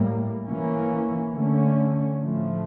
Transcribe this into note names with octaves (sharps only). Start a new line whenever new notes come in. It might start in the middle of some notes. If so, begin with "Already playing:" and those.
Already playing: A2 G3 A#3
E3 A#3 C#4
D3 A3 C#4
A2 F3 A3